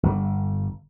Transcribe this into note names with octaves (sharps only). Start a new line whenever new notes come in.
G1